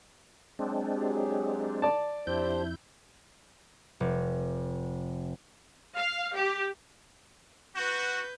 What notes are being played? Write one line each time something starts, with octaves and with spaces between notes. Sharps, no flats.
F#3 G#3 C4 D4
F#3 G4 G#4
D5 A5
F2 D4 E4 G4 C5 G6
F1
F5
G4
F#4 B4 G6